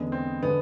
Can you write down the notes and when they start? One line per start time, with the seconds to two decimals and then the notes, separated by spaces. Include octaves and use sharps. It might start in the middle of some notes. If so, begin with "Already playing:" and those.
Already playing: E2 D3 G#3
0.12 C4
0.43 D3 G#3 B3